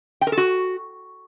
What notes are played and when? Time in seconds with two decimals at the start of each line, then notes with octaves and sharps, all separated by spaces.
0.21 G5
0.27 A#4
0.32 A4
0.37 F#4